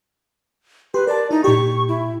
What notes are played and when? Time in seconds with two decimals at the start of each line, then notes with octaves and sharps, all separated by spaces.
0.94 G4 B4 C6
1.07 A#4 D5 A5
1.31 D#4 E4
1.44 A#2 G4 C#6
1.88 E4